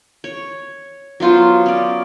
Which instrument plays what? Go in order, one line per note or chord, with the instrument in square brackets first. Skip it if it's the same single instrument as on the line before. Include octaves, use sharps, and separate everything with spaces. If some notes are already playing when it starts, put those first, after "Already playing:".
[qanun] C#5
F#3 B3 F4 C5
C#4 D5